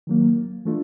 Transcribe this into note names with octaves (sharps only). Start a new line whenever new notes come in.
D#3 F#3 A#3
E3 A3 D4 F4